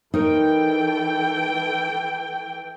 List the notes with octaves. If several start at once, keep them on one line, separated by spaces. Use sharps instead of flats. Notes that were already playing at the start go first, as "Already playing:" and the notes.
E3 D#4 A4 A#4 C#5 G5